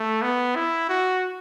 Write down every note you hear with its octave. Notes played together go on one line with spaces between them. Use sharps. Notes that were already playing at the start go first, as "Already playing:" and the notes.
Already playing: A3
B3
E4
F#4